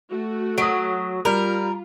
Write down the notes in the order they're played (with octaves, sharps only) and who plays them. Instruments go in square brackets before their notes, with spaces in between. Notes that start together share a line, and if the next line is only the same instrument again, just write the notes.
[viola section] A3 F#4
[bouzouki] F#3 [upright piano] D#6 B6 D7
[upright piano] G3 [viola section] F4 [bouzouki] A#4